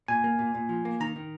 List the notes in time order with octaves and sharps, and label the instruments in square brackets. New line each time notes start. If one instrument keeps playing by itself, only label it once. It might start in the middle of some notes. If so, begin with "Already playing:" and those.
[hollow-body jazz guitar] A#2 [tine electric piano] G#5
[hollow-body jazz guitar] A#3
A#2
A#2
F3
A#3
[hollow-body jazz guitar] D#3 [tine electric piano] A#5
[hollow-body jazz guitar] D#3